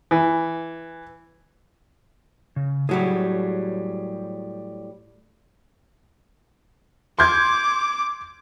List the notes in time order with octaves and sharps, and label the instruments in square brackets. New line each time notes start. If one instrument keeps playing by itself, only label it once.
[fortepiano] E3
[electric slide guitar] C#3
[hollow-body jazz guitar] A2 F#3 G3 [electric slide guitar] G4 G#4
[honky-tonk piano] C6 G6 G#6 [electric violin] D6